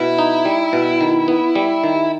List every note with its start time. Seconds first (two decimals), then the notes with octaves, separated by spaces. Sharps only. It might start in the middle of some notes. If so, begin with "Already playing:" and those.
Already playing: B2 E4
0.19 D#4
0.45 G3
0.73 B2
1.01 D#3
1.28 B3
1.55 G3
1.84 D#3